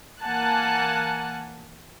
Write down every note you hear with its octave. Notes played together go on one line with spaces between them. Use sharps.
E3 A#3 F#5 G#5 A5 F#6